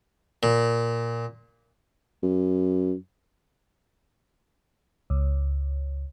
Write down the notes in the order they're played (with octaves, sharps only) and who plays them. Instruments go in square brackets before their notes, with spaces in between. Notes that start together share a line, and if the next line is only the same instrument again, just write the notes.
[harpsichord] A#2
[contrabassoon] F#2
[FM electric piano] C#2